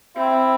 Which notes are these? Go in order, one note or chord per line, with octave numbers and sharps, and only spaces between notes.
C4 E4